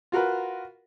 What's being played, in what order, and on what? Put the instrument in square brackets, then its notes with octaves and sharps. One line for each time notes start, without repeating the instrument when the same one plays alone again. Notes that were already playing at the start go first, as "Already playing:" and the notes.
[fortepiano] F4 F#4 A#4 B4